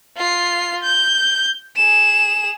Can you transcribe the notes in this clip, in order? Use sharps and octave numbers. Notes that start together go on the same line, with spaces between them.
F4 C7
G6
G#4 E7